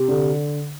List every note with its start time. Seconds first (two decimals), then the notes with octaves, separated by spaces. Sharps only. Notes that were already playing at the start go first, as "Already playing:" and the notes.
Already playing: C3
0.08 D3